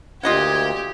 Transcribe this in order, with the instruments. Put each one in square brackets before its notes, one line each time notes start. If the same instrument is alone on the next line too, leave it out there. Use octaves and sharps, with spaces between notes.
[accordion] D2 A#2 [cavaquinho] F4 D#5 F#5 [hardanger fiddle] G4 [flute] G#6